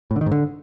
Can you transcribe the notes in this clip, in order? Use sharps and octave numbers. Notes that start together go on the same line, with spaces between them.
A2
D3
D#3
G#2
D3